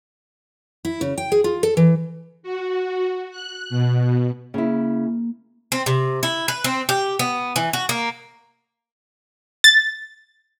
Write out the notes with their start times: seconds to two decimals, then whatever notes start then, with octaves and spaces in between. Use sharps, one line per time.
0.85 E4
1.01 C#3
1.18 G5
1.32 G#4
1.44 F4
1.63 A4
1.77 E3
2.43 F#4
3.31 F#6
3.70 B2
4.54 C#3 A#3 E4
5.72 C4
5.86 C3
6.23 E4
6.48 B4
6.64 C4
6.89 G4
7.19 B3
7.56 E3
7.73 F#4
7.89 A#3
9.64 A6